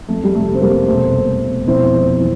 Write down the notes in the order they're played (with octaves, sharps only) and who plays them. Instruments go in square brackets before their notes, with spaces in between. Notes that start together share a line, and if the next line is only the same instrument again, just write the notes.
[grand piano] F2 A3
G3
C3 A3
C4
F1 G3 A#3
E1 A3 C4
E1
E1
F2 C4 E4
F2
E3